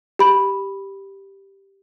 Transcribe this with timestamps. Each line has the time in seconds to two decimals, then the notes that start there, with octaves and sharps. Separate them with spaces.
0.19 G4 B5